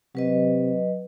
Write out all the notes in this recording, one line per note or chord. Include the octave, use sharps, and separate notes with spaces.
C3 F#3 B4 D#5